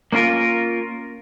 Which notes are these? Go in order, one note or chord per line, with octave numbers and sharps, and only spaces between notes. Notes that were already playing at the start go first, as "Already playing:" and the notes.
A#3 C#4 F4 A#4